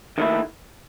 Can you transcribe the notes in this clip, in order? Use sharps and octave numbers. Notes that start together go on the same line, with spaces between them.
D#2 D#3 A3 E4